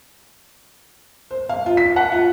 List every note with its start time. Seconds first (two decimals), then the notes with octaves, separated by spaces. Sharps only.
1.31 C5
1.49 F5
1.66 F4
1.77 B6
1.96 F#5
2.12 F4